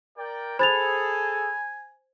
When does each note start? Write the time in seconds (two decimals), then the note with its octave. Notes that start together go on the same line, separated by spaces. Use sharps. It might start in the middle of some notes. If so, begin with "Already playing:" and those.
0.17 A#4 D5 G5
0.59 G#4 A4 C5 G#5 B5 A6 F7